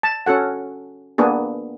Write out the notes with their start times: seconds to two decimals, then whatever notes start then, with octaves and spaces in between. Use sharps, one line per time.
0.03 A5
0.26 C#4 F#4 A4 F#5
1.18 A#3 B3 D4 G#4